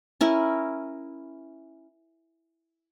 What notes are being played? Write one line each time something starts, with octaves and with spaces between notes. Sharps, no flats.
C#4 E4 A#4